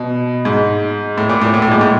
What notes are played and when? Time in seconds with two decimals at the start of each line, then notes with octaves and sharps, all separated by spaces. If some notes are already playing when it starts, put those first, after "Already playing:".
Already playing: B2
0.45 G#2
1.18 A2
1.29 A#2
1.42 A2
1.54 A#2
1.62 A2
1.72 G#2
1.81 A2